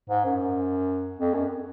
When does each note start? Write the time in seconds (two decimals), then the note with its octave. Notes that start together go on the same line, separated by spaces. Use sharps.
0.10 G#2
0.25 F#2
1.19 F2
1.34 F#2